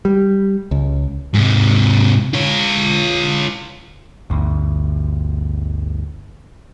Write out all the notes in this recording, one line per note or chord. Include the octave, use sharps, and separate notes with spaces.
G3
C#2
G#2 C3
F4 C#5
G1 D2